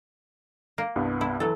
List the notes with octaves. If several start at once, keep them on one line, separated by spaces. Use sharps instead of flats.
A#3
C2 G2 B3
E4
E3 F#3 A4